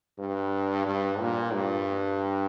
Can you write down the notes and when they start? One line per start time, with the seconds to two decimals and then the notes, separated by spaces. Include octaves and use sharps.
0.18 G2
0.86 G2
1.20 A#2
1.54 G2